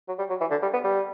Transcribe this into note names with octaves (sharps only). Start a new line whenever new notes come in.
F#3
G3
F#3
E3
D3
G3
B3
G3